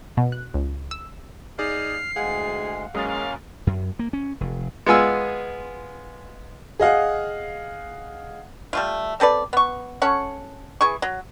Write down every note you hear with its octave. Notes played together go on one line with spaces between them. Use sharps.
B2
F#6
C#2
E6
D#4 G#4 D5 F6 C7
D2 G#3 G#4 F5 F#5
F#2 G#3 A#3 C#4 F5 D#6 A6
F5
F#2
A#3
C#4
F1
G#3 B3 F4 G#5 E6
G#4 D#5 F5 F#5
G3 A3 F4
C4 A4 B4 D5
B3 C#6
C#4 A4 C#5 F#5
E3 G#4 C#6
F#3